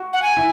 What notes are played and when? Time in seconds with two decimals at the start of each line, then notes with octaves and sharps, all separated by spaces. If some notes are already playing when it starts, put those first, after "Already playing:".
Already playing: F#4
0.13 F#5
0.22 G#5
0.37 E4